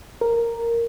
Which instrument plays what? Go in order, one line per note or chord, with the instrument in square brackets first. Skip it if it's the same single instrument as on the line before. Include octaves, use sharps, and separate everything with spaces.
[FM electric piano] A#4